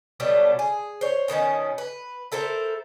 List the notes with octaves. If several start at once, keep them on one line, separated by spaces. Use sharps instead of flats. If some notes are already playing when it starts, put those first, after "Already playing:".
B2 F#3 G3 A3
G#4
C5 C#5
B2 D#3 B3 C#4
B4
E4 A4 A#4 C5